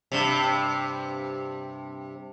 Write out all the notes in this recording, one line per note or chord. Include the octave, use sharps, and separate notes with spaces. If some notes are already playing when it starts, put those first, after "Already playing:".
G2 C3